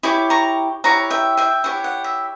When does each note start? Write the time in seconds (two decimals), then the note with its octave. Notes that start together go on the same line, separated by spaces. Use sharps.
0.03 E4 G4 C#5 B5 D6
0.30 A#5 C#6
0.84 E4 G4 C#5 F#5 A#5
1.10 E5 G5
1.37 E5 G5
1.64 E4 G4 C#5 F#5
1.84 F#5
2.04 E5